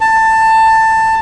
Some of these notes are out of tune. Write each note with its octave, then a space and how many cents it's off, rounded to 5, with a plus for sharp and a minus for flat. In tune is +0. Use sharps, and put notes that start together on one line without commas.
A5 +15